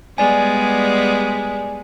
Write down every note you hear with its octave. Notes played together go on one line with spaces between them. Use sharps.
G3 G#3 B3 D5 G#5